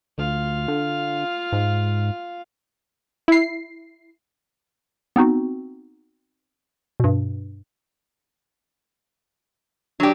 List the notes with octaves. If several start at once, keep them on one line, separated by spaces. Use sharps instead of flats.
D2 F4 F5
D3
G#2
E4 C7
B3 C4 D#4 F#4
G2 B2
F#3 D4 G4